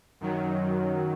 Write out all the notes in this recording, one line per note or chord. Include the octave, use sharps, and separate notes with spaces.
F#2 D#3 F#3